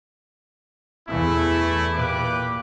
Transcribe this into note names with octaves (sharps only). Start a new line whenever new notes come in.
E2 E3 A3 E4
A#2 G4 B4 D6